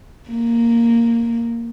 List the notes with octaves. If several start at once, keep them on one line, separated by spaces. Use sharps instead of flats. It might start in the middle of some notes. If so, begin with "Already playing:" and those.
A#3